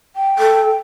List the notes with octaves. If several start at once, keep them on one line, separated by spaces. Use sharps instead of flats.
G5
A4